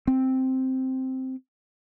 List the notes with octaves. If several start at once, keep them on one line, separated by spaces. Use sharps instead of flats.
C4